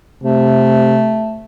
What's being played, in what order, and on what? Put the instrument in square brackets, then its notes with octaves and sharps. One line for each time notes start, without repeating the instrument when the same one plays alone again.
[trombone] C3 [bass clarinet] A3